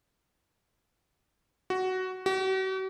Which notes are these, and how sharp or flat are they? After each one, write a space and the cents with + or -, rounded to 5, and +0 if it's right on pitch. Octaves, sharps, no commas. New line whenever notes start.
F#4 +10
F#4 +45